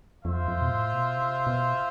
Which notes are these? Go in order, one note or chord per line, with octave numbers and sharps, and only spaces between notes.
F2 F4 C5 E5
F2
B2
A2
B2
C3
B2